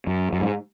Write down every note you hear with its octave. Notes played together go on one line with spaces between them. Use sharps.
F#2
F#2
G#2